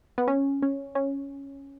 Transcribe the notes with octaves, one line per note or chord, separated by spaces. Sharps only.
B3
C#4
C#4
C#4